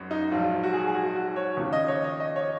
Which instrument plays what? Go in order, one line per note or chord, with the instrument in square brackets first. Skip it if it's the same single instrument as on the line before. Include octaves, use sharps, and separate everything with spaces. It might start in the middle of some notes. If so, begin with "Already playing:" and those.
Already playing: [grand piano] G#1 F#2
D#4
A#1 G#2 F#3 F4
F#4
G#4
G#4
F#4
F#4
C#5
D#2 C#3 F3
D#5
C#5
D#5
D#5
C#5